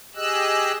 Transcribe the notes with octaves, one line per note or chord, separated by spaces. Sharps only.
G4 G#4 D#5 E6 F#6